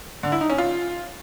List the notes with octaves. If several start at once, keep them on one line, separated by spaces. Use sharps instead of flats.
D3
E4
D#4
C#4
F4